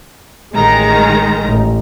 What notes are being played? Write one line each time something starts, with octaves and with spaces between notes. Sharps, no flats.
A1 D#3 G#3 A#5
A1